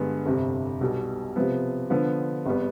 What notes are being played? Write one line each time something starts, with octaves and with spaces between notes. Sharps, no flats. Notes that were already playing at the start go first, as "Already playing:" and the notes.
Already playing: G2 D3 G#3 B3
G1 F2 C3
B1 B2 G3
C3 F3 B3
D3 F3 B3
G#1 G3 B3